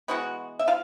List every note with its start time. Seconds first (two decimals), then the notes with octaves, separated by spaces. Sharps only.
0.08 E3 G#3 B3 F#4 F#5
0.59 E5
0.68 F4 F5